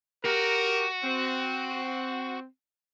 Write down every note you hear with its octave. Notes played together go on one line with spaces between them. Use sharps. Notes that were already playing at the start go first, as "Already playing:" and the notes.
F#4 G4 A#4
C4